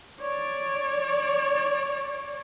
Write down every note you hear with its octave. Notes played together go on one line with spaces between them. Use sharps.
C#5 D5